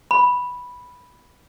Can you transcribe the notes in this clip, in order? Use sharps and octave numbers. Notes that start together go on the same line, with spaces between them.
B5